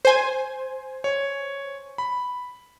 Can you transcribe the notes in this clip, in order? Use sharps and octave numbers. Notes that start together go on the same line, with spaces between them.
C5 G#5
C#5
B5